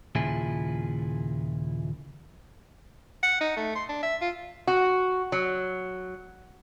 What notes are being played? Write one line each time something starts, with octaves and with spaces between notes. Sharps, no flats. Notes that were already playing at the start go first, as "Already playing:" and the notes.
D#2 A#2 C#3 F3 E4 G#4
F#5
D#4
A3
C6
D4
E5
F4
F#4
F#3